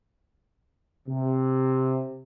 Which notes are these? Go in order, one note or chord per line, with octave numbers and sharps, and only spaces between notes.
C3